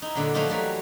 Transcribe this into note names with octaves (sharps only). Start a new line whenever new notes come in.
D#4 E4
A#2 D3 F#3
F3 F#3 A3 A#3 D#4 F4
E3 F#3 G3 A3